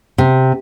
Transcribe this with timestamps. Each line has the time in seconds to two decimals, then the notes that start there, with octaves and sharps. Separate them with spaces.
0.18 C3